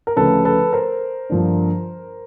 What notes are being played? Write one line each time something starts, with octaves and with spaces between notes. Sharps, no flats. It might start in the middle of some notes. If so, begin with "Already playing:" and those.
A#4
D2 C#3 F3 A3 A4 B4
A4 B4
A#4 C5
G2 D3 F3 A#3 D4